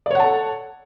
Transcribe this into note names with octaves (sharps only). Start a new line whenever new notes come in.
A4 C#5 D5 F#5 A5